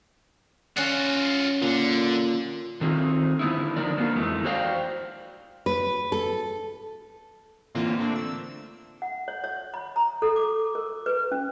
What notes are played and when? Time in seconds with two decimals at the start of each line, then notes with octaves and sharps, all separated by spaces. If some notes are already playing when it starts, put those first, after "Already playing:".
0.77 C#4 F4 F#4 F#5
1.62 A#2 D3
2.81 D#3 A3 C4 F4 G#4
3.39 D3 B3 D#4 E4
3.76 D3 F3 A#4 D5
3.97 A#3 B3 D4 F#4 A#4
4.15 F2 E3 G#3 A3
4.44 F#4 C5 D5 F5 G5
5.66 B4
6.12 A4
7.75 A2 D3 E3 A#3 C4 F4
7.98 A3 A#3 C4 D4
8.16 E6
9.02 F#5
9.28 C#5
9.44 C#5
9.74 B5
9.96 A#5
10.22 A4
10.36 D6
10.75 A#4
11.06 B4
11.32 C#4